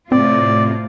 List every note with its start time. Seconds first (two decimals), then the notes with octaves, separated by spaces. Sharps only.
0.12 A2 C3 C4 F4 D5